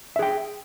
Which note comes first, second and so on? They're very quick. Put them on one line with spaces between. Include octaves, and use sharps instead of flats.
E5 G#4 G5